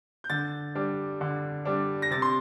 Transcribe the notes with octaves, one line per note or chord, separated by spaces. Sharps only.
G6
D3 A6
G3 D4
D3
G3 D4
A#6
C3 A6
C6